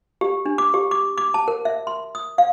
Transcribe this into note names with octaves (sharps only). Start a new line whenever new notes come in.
G4
D4
D6
G4
D6
D6
A5
A#4
E5
C6
D#6
F5